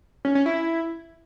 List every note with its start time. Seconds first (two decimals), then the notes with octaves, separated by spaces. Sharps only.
0.25 C#4
0.35 C#4
0.46 E4